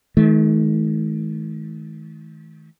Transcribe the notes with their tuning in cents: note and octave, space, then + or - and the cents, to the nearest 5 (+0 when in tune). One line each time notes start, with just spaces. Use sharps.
D#3 +40 A3 -40